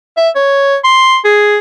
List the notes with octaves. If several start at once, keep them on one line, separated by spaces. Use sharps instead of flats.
E5
C#5
C6
G#4